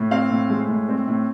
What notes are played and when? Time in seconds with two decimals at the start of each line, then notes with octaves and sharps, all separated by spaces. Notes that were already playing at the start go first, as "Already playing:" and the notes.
Already playing: A2
0.11 C4 F5
0.30 A2
0.50 G#3
0.69 A2
0.88 C4
1.08 A2